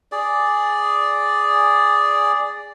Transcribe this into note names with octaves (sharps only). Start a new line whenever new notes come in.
G#4 D5